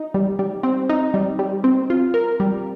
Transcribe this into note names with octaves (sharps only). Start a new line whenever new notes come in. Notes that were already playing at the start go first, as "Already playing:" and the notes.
Already playing: D#4
G3
G3
C4
D#4
G3
G3
C4
F4
A#4
G3